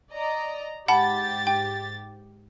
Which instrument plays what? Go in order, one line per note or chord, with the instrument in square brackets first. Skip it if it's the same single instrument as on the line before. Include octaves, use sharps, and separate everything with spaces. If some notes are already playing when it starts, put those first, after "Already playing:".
[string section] D5 D#5 A#5
[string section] G#2 G4 A6 [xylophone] F#5 A5 B5
[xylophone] G5